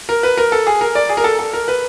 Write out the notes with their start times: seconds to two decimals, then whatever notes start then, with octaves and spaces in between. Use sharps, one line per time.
0.09 A#4
0.23 B4
0.37 A#4
0.52 A4
0.67 G#4
0.81 A#4
0.95 D5
1.09 G#4
1.17 A#4
1.24 A4
1.39 A4
1.53 A#4
1.68 B4